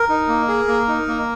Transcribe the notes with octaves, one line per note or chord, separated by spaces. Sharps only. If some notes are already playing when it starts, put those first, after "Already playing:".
Already playing: A#4
D#4
A#3
G#4
A#3
D#4
A#3